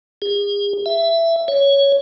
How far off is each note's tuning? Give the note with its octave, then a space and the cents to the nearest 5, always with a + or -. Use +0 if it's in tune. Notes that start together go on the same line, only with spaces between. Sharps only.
G#4 -40
E5 +15
C#5 +5